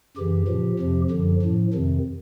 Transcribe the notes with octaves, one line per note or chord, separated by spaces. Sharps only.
F#2 C#3 E3 G4
A#2 F3
F2 C3 F3
F#2 D3 F3
A2 F3
F2 C3 D#3